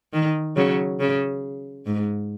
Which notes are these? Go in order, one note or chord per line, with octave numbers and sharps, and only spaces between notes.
D#3
C#3 F#3
C#3
G#2